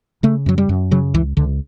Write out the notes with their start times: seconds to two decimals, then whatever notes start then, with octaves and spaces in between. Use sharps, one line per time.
0.23 C#3 A3
0.46 F#2 F#3
0.58 G3
0.69 F#2
0.91 C#3 F#3
1.14 C#2 E3
1.37 C#2 D3